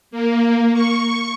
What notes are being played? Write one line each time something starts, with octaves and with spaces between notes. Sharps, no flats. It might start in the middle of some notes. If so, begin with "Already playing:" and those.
A#3
C#6